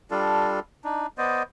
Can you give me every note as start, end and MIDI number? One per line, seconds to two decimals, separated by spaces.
0.11 0.60 55
0.11 0.60 62
0.11 0.60 65
0.11 0.60 69
0.84 1.07 62
0.84 1.07 63
1.18 1.43 59
1.18 1.43 72
1.18 1.43 74
1.18 1.43 75